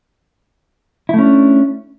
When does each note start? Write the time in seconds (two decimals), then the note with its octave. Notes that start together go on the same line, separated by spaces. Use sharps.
1.09 E4
1.14 A3
1.18 C#4
1.23 D4